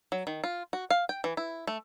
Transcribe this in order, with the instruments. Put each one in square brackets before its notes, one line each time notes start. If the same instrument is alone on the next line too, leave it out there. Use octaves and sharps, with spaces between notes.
[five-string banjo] F#3
D#3
F4
F#4
F5
G5
E3
E4
A3